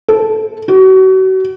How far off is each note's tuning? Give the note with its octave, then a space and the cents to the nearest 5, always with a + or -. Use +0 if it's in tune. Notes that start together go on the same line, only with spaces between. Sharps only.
A4 -10
F#4 +35